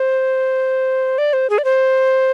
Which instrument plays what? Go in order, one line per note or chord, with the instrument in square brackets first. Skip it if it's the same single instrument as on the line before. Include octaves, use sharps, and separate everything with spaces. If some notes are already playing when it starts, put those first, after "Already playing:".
Already playing: [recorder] C5
D5
C5
G#4
D5
C5